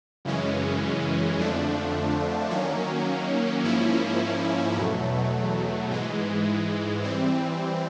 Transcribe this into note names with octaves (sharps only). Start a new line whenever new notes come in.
F#2 C#3 E3 G#3 C#4
F2 D3 F3 A3 D4
D#3 F#3 A#3 C#4
G#2 F3 A#3 C#4 E4
E2 B2 F#3 A3
G#2 E3 G#3
E3 G3 C4